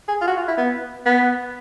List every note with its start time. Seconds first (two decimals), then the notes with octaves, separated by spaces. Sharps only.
0.08 G#4
0.21 F4
0.27 F#4
0.37 F4
0.48 E4
0.57 B3
1.06 B3